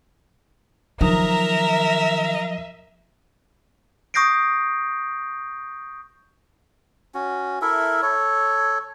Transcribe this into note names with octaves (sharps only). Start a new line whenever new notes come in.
D#3 F3 F#3 A#4 E5 A#5 D#6
C#6 D#6 G6 A#6 C7 D7
C#4 F#4
E4 A4 A#4 E5
A4 C#5